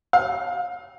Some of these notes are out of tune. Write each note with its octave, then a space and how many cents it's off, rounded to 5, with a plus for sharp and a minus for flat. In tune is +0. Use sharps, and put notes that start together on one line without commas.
F5 +25